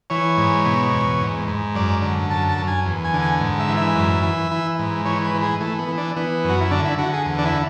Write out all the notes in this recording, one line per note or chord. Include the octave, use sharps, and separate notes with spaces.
E3 C#5
G#2
B2
E2
G#2
G#2
F#2 D5
D3
F#2 A5
A5
F#2
G#5
E2
G#5
D3
G#5
G#2
E5
E3
E5
F#2
E3
E3
G#2
E3 C#5
B4
E3
G#4
E3 A3
B3
E3
D4
E3 B3
F#2
F#4
E4
D3 D4
E4
D3 F#4
G#4
E2
D4
E4